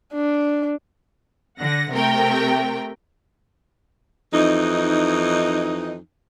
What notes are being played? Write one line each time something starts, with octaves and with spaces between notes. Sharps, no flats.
D4
D3 F#5 A#6
C3 A3 A#4 G5
F2 E3 D#4